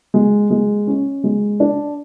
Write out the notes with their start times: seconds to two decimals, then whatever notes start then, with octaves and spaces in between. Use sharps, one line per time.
0.14 G#3
0.50 G#3
0.87 C#4
1.24 G#3
1.60 D4